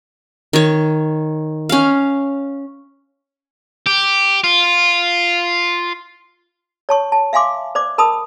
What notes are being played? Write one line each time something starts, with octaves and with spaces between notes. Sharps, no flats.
D#3 C#5
C#4 F5
G4
F4
C#5 A5 C#6
A5
E5 F5 G#5 C6 D6
C5 D5 D6
A#4 A5 B5 D#6